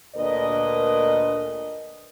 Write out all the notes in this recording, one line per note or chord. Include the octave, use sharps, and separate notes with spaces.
D2 A#2 D4 A#4 B4 D#5